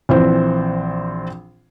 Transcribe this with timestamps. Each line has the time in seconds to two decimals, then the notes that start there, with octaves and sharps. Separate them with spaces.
0.09 A#1 E3 C4 C5